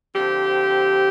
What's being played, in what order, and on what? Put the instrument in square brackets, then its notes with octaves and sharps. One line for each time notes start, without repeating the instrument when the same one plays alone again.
[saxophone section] D3 F3 C4 G4